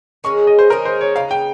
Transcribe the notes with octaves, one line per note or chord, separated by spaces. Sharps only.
D#3 G#3 C#4 G#4 C#6
D#5
C5
D#3 G#3 C#4 G#4 A#4
C5
C#5
C#3 G#3 D#4 F5
G5